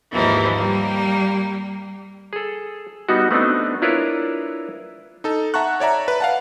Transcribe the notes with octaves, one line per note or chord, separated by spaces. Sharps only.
D#2 G#2 E3 F3 A#3
G3 A#3
G#4 A4
G3 B3 D#4 F#4
A3 B3 C4 D4 D#4
D4 E4 F4 A#4 B4 C#5
D#4 A4
E5 F#5 A5 A#5 C#6 F#6
C#5 D5 E5 A#5
B4
F5 F#5 A5